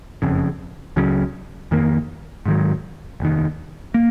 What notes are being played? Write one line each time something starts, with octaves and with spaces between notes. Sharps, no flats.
F#1 F2 C#3
C#2 C#3 F#3 C#4
F2 D#3 A#3
G#2 D#3 F#3
F1 D#2 D#3
A#3